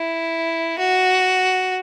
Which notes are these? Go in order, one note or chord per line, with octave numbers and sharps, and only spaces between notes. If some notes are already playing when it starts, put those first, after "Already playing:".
Already playing: E4
F#4